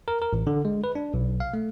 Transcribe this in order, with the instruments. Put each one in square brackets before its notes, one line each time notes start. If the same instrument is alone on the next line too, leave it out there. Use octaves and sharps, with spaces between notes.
[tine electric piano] A#4
A#4
A1
D3
G#3
B4
D4
B1
F5
A3